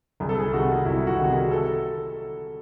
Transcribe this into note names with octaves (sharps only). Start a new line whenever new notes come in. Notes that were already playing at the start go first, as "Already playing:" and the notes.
C2 G#4
A4
G#4
C3 D#3 F#4
C2 E4
F#4
C3 D#3
G#4
A4